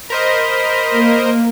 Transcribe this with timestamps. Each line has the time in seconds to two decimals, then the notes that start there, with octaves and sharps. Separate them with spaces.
0.10 A#4 C5 D#5 B5
0.95 A#3